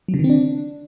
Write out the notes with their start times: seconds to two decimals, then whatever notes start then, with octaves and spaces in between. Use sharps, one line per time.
0.08 F#3
0.14 C#3
0.19 D#3
0.24 C4
0.29 D4